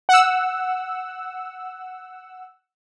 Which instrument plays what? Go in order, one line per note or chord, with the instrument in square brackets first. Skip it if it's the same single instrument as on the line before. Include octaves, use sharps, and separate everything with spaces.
[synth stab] F#5 E6